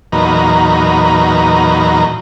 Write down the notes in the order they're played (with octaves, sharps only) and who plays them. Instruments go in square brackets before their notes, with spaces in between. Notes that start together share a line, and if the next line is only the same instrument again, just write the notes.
[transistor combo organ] E2 A#2 F#3 D#4 B4 A#5